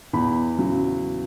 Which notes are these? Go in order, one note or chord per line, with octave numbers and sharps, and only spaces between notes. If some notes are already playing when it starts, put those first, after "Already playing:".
E2 B5
C#3 F#3